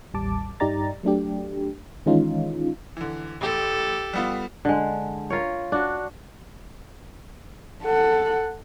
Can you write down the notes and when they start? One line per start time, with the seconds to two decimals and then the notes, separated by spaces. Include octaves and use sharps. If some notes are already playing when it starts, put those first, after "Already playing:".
0.14 A1 D#2 G3 A5 D6
0.60 G2 D#4 G4 D5 A#5 A6
1.03 F#3 A3 D4 G4
2.06 D#3 E3 G#3 C#4 D#4 F4
2.97 D3 E3
3.41 A1 G4 A4
4.13 G3 B3 F4
4.65 D3 G#3
5.30 F4 A#4 C#5
5.72 D4 F#4
7.83 A4 F#5